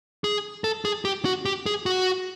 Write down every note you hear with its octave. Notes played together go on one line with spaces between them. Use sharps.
G#4
A4
G#4
G4
F#4
G4
G#4
F#4